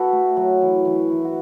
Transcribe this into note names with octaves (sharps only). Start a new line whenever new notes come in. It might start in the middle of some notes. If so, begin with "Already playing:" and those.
Already playing: F#4 A4 B4
A3
F#3
E3
E3
E3
F#4